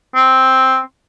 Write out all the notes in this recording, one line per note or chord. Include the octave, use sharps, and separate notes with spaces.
C4